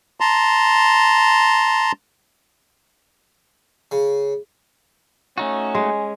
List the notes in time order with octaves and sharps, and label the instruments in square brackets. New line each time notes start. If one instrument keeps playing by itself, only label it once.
[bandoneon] A5 A#5 C6
[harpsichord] C#3
[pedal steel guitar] A3 D#4 F#4 [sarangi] C#4
[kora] G#3